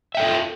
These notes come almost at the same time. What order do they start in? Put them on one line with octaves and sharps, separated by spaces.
E5 G5 A4 D#4 F4